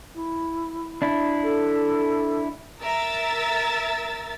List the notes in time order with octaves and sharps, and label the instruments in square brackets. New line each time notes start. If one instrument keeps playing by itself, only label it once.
[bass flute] E4
[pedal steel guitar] D4 E4
[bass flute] A4
[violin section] A#4 E5 E6 A6